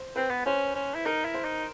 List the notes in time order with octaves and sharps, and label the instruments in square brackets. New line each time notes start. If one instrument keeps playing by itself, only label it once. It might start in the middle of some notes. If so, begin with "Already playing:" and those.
Already playing: [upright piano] C5
[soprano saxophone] C4 [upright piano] B4
[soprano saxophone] B3
[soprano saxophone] C#4 [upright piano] C5
[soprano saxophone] C#4
E4
[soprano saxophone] D#4 [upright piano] A#4
[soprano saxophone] E4
[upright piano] C5
[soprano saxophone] D#4